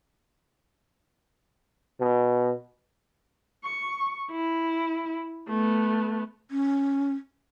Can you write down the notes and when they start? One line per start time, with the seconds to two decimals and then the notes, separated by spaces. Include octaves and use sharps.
2.00 B2
3.64 C#6
4.31 E4
5.48 A3 B3
6.51 C#4